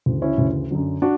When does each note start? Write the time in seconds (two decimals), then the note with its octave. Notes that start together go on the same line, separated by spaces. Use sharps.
0.06 D2 C#3 E3
0.22 C#4 E4
0.38 D2 C#3 E3
0.71 F#2 D3 F#3
1.02 D4 F#4